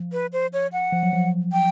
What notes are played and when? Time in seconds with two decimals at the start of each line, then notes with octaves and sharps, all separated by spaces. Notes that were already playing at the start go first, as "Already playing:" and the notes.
Already playing: F3
0.12 B4
0.33 C5
0.53 C#5
0.72 F#5
0.92 F3
1.03 F#3
1.13 F3
1.52 G5